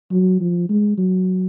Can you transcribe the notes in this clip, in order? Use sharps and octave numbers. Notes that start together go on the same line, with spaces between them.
F#3
F3
G#3
F#3